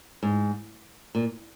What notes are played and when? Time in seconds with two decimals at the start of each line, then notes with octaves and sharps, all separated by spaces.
0.23 G#2
1.15 A#2